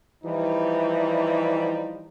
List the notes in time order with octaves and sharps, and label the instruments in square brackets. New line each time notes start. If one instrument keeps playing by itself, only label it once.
[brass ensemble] E3 F3 G3 D#4